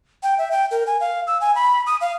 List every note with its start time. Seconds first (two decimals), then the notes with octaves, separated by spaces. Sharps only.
0.23 G5
0.38 E5
0.52 G5
0.71 A#4
0.87 G#5
1.01 F5
1.27 E6
1.41 G#5
1.55 B5
1.86 D#6
2.01 F5